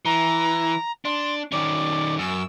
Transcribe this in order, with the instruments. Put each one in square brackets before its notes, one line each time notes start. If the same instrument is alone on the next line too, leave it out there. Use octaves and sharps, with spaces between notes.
[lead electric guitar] E3 [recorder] A#5
[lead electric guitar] D4 [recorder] C6
[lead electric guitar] D#3 C#4 [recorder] D5
[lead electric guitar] F#2 [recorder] E6